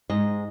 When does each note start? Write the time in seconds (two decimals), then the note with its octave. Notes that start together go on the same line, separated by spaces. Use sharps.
0.10 G#2 D#5